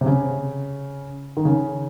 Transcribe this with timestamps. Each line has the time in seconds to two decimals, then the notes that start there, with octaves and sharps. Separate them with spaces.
0.01 C3
0.06 C#3
1.37 D#3
1.45 C#3